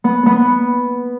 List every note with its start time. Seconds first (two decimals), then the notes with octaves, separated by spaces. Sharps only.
0.04 B3
0.26 B3